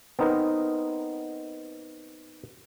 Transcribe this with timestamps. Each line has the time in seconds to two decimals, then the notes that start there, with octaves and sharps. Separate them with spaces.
0.19 B3 C4 D#4 A#4